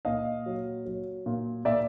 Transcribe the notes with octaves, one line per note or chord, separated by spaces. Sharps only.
A#2 D#5 F5
F#3
F#3
A#2
A#2 D5 E5